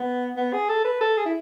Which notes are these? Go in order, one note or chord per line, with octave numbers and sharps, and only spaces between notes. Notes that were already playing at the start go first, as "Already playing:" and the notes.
Already playing: B3
B3
G#4
A4
B4
A4
G#4
E4